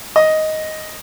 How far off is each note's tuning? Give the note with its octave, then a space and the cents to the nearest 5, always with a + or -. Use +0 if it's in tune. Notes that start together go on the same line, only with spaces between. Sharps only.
D#5 +5